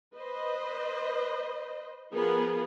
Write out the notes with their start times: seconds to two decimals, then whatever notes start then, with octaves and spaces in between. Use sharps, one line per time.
0.17 B4 C5 D#5
2.14 F3 B3 G#4 A#4 B4